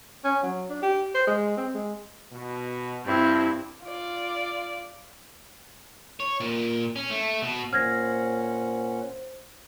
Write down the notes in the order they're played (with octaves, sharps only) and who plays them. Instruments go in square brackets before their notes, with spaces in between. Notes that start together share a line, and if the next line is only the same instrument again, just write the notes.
[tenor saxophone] C#4
F#3
D4
G4
C5
G#3
C4
G#3
[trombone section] B2
[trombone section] G2 [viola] C4 E4
[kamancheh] F4 D5
[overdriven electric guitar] C#5
A#2
C#4
A3
B2
[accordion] A#2 C#4 F#5 [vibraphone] C5 [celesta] F6 G#6 A#6